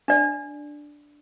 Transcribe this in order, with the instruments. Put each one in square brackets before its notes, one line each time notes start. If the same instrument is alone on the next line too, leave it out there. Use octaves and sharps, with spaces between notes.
[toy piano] D4 D5